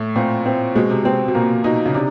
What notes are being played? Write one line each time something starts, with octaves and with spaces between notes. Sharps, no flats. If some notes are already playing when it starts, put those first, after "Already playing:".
Already playing: A2 A3
A#2 C4
C4
B2 G#3
C3
B2 C4
B2
A#2 A#3
B2 D#4
C#3
C3 D4